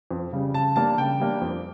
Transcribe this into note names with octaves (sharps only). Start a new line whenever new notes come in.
F2
C#3 G3
C#3 A5
G3 A#3 D4 A5
C#3 G5
G3 A#3 D4
F2